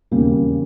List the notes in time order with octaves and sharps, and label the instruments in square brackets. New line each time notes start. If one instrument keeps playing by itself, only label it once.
[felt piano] E1 D#2 C#3 G3 A#3